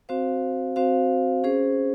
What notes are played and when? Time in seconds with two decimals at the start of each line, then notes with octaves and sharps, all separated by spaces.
0.09 C4 F#4 C5 F5
0.76 C4 F#4 C5 F5
1.44 C#4 G#4 C5